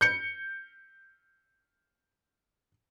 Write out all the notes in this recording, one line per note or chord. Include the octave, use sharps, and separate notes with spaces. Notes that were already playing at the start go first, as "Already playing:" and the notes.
G6 C#7